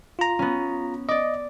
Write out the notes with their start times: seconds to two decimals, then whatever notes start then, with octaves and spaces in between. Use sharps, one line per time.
0.19 F4 A#5
0.39 B3 C#4
1.09 D5 D#5 D6